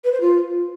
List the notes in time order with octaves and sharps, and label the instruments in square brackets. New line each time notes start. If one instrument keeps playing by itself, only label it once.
[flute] B4
C5
F4